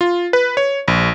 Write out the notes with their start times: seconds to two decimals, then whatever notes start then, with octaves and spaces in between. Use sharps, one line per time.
0.01 F4
0.33 B4
0.57 C#5
0.88 A#1